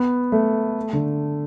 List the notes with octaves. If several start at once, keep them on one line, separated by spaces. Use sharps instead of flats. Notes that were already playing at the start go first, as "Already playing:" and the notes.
Already playing: B3
A3
D3